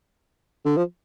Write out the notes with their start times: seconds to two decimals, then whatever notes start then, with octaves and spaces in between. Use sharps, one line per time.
0.66 D3
0.77 F3